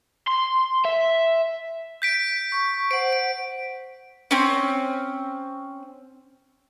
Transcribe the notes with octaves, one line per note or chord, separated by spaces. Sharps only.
C6
E5
G6 B6 D7
C#6
C5 F#5 D7
D7
C4 C#4